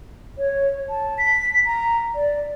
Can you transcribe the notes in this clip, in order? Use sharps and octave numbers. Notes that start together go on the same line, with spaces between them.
C#5
A5
B6
A#5
D5